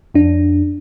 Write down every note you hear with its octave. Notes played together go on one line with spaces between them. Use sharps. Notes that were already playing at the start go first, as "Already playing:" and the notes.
F2 D4